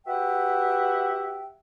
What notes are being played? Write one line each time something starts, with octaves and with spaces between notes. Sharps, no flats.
F#4 G4 B4 E5 F#5 G5